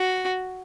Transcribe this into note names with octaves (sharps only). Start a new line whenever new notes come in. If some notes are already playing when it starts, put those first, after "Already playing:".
Already playing: F#4